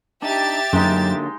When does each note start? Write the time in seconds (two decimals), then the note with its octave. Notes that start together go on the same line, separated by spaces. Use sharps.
0.22 D4 D#4 G4 E5 A6
0.73 F#2 D3 F#3 G#3 A#3 D#4